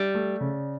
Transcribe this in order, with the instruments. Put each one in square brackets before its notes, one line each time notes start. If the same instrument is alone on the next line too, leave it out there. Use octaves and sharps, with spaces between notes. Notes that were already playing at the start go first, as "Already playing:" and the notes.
Already playing: [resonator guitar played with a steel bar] G3
[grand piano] A3
C#3